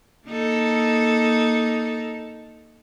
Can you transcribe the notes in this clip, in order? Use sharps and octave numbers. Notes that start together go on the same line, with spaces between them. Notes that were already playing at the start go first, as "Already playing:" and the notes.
A#3 D#4 A4